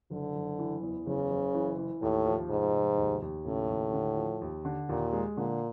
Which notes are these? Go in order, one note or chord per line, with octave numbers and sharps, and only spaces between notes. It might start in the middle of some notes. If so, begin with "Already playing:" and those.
F#1 D3
F#1
E3
E2
F#1 C#3
F#1
E3
E3
D#2 A2
F3
F1 G#2
F1
D#2
D#2
A2 C#3
D#2
D3
F3
D#2
D3
D#2 A#2
G#3
A#2 D3